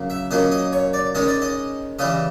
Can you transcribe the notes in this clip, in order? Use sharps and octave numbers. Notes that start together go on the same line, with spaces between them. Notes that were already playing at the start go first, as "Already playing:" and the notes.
Already playing: C#3 F#3 A#3 C#4
E5
A#2 F#3 A#3 C#4 D#5
D#5
C#5
D5
D#3 G#3 C#4 D#5
D5
D#5
C#3 E3 G3 D#5